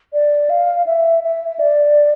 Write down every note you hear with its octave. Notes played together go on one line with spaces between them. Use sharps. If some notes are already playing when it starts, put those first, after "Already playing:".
D5
F5
E5
E5
D5